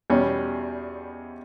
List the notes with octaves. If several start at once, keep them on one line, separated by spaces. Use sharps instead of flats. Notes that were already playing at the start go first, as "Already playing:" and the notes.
E2 B2 G3 C#4